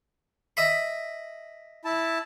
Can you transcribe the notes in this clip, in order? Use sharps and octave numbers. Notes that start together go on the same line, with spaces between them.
D#5 E5 B5
E4 A5